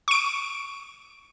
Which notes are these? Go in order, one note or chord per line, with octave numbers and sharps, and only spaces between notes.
C#6 D7